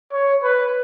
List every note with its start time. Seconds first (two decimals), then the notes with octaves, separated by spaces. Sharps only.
0.12 C#5
0.43 B4